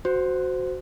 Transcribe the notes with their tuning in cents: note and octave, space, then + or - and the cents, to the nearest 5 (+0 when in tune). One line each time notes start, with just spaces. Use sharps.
F#4 +0 C5 -20